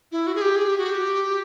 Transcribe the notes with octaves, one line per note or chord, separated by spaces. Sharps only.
E4
F#4
G#4
G4
G#4
G4
F#4
G4